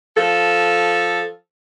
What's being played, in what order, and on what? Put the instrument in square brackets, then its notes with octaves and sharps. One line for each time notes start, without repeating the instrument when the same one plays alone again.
[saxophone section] F3 A4